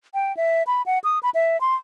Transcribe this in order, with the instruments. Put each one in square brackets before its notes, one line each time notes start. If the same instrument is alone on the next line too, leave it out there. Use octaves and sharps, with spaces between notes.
[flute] G5
E5
B5
F#5
D#6
B5
E5
C6